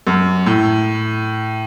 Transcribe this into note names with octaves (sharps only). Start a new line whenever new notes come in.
F#2
A2